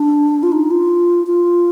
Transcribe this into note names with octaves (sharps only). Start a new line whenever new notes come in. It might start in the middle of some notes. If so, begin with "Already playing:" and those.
Already playing: D4
F4
D#4
F4
F4